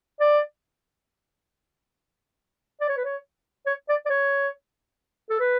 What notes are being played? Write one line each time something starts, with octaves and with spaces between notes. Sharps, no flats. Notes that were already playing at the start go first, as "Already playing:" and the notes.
D5
D5
C#5
B4
C#5
C#5
D5
D5
C#5
A4
B4